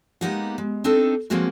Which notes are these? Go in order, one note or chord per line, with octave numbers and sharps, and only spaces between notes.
G#3 A#3 B3 D#4 G4 F#5
G#3
C4 D4 D#4 A4
F3 F#3 G#3 A#3 C4 F#4